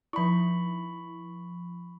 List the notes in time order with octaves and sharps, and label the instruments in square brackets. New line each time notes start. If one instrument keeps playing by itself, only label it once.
[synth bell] F3 E4 [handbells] B5 C#6